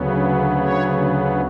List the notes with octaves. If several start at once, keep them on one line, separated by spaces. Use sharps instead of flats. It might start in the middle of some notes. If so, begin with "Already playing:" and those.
Already playing: D2 C#3 F#3 B3
C#5